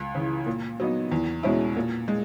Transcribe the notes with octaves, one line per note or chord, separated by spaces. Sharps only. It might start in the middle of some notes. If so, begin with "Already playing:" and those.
Already playing: C#2
C#3 E3
A#2
F#3 B3 D#4
E2
B2 G#3 C#4 E4
A#2
G#3